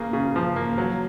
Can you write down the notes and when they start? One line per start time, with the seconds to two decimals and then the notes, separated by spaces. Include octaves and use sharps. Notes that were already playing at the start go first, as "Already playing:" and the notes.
Already playing: C#3 A#3
0.13 C#3
0.36 F3
0.56 A#3
0.78 F#3